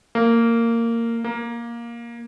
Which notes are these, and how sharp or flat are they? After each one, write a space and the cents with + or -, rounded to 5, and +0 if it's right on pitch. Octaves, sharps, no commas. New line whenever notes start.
A#3 -15
A#3 +10